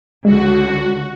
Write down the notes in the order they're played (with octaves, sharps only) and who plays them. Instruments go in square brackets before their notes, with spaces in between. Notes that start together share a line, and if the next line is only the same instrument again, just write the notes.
[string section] C#2 D3 [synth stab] G#3 [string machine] F#4